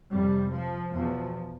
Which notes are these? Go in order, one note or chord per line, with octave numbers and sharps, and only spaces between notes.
F2 C3 G3
F3
E2 B2 F3